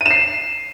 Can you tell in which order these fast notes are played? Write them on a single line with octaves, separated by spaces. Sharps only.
D#7 E7 C7